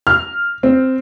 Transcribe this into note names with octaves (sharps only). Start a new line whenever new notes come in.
F6
C4